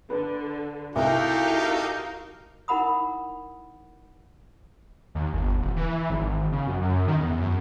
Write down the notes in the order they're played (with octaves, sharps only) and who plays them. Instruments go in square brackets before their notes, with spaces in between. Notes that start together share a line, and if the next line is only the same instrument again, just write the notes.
[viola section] D3 [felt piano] B4
[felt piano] C2 [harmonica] D#4 G4 A4 [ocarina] E4 [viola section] F#4 A#4 F5
[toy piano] D#4 E4 A#4 F#5 B5 D#6
[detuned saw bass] D#2
G1
D#1
E3
G#1
C#3
F#2
F#2
D#3
E2
F#2